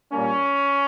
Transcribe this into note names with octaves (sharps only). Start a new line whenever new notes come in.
A#2 G3 A#3 C#4